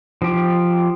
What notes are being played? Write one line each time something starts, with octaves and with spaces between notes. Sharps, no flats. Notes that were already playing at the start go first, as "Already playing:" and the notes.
F3 G4